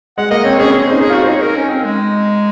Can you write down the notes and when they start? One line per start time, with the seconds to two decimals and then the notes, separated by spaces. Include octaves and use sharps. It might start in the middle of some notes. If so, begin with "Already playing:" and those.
0.18 G#3 F#5
0.31 A#3 D#5
0.45 C4 C#5
0.59 C#4 G#4
0.72 C#4 G#4
0.87 D#4 C5
1.01 G#4
1.10 F4 F#4
1.23 C5
1.29 D#4 C#5
1.42 A#4
1.56 C#4
1.70 C4
1.85 G#3